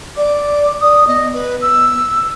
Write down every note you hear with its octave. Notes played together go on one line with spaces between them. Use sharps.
D5 D6
D5 D#6
B3 D#5
B4
E6